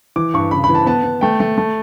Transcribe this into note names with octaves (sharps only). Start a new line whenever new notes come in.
E3 D6
G2 C#6
C#3 B5
B5
E3
A5
B3 A5
B3
A3 G5
A3
A3